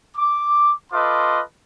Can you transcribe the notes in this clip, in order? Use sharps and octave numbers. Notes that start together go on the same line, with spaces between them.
D6
F4 A4 B4 D#5 C6 D6